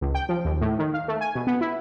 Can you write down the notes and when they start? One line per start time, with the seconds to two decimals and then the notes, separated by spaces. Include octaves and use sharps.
0.01 C#2
0.15 G5
0.29 F3
0.45 D#2
0.61 A2
0.79 D#3
0.94 F5
1.08 A3
1.21 G#5
1.35 B2
1.47 B3
1.61 E4